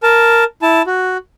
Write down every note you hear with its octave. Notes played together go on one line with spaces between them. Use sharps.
A#4 A5
E4 A5
F#4